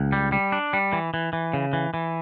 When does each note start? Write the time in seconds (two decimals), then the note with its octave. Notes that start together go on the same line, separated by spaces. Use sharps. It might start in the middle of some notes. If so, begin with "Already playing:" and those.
Already playing: C#2
0.12 G3
0.32 G3
0.52 D4
0.73 G3
0.93 E3
1.14 E3
1.33 E3
1.53 C#3
1.73 E3
1.94 E3